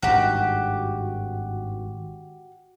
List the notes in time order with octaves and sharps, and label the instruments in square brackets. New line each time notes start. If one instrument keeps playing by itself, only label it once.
[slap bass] G#1 G2 [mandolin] F#4 G4